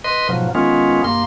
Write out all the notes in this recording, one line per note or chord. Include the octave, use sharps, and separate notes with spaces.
B4 D#5 C6
G#2 B2 F3 F#3
D#3 G#3 B3 C#4 F4
G2 A#3 C6